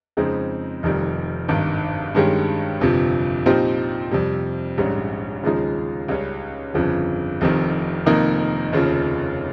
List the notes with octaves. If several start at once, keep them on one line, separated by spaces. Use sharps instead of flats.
F2 C#3 G#3 C4 D#4
F1 F2 D#3 G3
G#1 G2 D#3
G2 D#3 G#3 C#4 G4
G1 F2 C3 F3
A#2 F3 C4 D#4 G4
F2 C3 G3
A#1 G#2 G3 C#4
D#2 C#3 F3 G#3 D#4
C#2 C#3 G3 C#4
G1 F2 C#3 F3
F1 F2 C3 D#3
F1 F2 D#3 A#3 D#4
F1 D#2 C#3 F3